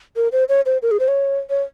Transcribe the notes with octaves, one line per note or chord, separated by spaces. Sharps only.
A#4
C5
C#5
C5
A#4
G#4
C5
C#5
C#5